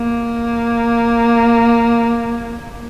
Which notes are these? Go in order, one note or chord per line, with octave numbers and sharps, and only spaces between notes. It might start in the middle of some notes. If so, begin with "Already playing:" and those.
Already playing: A#3